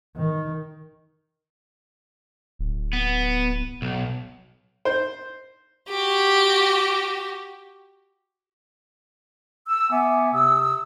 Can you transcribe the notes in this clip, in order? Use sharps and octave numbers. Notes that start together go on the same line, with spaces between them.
D#3
D1
B3
B1
C5
F#4 G4
E6
B3 E5 F#5 G#5 D6
C3 D#6 E6